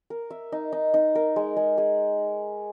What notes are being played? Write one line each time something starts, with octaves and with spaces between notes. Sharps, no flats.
A#4
E5
D#4
D#4
D#4
A#4
G#3
G#3
G#4